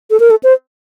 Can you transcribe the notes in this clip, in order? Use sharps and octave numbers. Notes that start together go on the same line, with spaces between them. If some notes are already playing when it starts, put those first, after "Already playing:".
A4
A#4
A4
C5